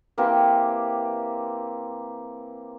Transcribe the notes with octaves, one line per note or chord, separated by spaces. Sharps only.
E3 A#3 C4 G4